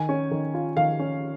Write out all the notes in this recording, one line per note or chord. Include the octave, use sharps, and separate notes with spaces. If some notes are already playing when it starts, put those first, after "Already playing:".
Already playing: D#3 G#5
C#4
D#3
F4
D#3 F5
C#4